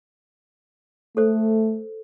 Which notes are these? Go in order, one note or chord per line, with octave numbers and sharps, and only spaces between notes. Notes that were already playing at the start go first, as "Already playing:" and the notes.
A3 A4 C5